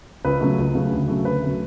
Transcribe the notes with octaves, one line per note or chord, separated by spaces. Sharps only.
C#2 B4
C#3 F#3 A3
C#2
C#3 F#3 A3
D2
C#3 F#3 A3
D2 B4
C#3 F#3 A3